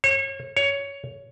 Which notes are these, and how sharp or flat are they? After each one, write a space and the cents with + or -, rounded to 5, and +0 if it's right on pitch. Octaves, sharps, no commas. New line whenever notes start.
C#5 -35
C#5 +10